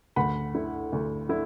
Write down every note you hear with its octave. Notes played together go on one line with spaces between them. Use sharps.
D2 F#5 B5
D3 A3 E4
D2
D3 E4